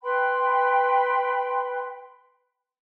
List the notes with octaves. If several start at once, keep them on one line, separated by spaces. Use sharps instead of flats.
B4 G5 B5 C6